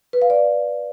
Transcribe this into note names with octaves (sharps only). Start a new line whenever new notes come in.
B4
F5
D5